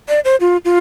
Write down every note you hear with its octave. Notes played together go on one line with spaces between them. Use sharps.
D5
C5
F4
F4